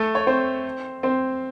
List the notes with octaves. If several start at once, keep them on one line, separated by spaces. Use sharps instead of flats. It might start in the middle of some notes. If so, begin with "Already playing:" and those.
Already playing: A3 A4
C#5
C4 C5
C4 C5